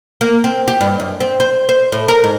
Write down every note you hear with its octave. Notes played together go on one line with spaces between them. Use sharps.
A#3
C4
G4
G2
F#2
C4
C5
C5
A2
A#4
G#2